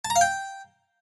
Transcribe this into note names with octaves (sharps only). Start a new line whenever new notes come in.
A5
A#5
F5
G5